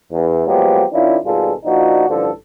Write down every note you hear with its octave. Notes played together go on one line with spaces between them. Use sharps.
E2
F3 F#3 G#3 A#3 B3 G4
D#3 C#4 D4 E4 F4
G#1 B2 G3 F4 G#4 A4
A#2 F3 D4 D#4 F#4
A1 G2 D3 F3 A4